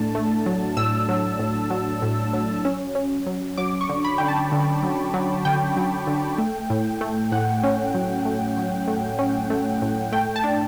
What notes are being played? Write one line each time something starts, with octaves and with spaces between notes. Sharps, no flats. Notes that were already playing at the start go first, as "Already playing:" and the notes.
Already playing: A2 A3 D4 A5
A3
F#3
A2 E6
F#3
A2
F#3
A2
F#3
C#4
C#4
F#3
F#3 D6
C#6
D3
B5
D3 G5
A5
D3
F#3
F#3
D3 G5
F#3
D3
A3
A2
A3
A2 F#5
C#4
F#3
A3
F#3
A3
C#4
A3
A2
A3 G5
A5
D4